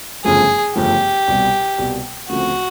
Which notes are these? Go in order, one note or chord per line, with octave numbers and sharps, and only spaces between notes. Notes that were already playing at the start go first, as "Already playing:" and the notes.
G1 F#2 C#3 F3 A3 G#4
G1 F#2 C#3 F3 A3 G4
C2 B2 G3
C2 B2 G3
D2 C#3 F3 A3 C4 F#4